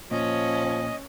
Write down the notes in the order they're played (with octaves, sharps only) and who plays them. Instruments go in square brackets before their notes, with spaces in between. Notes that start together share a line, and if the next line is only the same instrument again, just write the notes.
[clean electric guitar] A#2 [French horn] F3 [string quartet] C#4 [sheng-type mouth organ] D#5